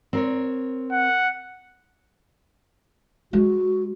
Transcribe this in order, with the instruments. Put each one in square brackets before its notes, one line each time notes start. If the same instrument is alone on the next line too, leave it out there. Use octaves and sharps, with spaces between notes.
[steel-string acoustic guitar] C4 A#4 C#5
[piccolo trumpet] F#5
[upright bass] G#3 [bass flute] F#4